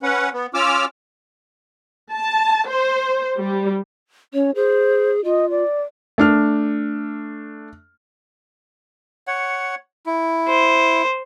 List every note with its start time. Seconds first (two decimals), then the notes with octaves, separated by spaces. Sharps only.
0.03 C#4 B4 F#5
0.33 B3
0.54 C#4 F4 D6 E6 F6
2.12 A5
2.69 C5
3.38 G3
4.34 C#4 C#5
4.55 G#4 C5
5.24 F4 D#5
5.50 D5
6.18 A3 D4 F6
9.27 C#5 F#5
10.06 E4
10.48 C5